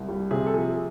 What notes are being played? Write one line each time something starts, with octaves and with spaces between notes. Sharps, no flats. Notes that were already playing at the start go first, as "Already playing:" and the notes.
Already playing: C2
G3
C3 G#4
A4
F3 G#4